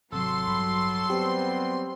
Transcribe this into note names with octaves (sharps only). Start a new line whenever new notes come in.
G#1 C3 F#3 A4 C6 E6 C7
A1 G2 B5
G3 B3 C4 G4